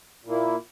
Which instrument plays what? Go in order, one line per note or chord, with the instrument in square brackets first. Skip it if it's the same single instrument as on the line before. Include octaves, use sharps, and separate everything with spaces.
[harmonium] A#2 A#3 E4